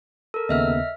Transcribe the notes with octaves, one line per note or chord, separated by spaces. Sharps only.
A4 A#4
D#2 C#3 B3 D#5 E5 F6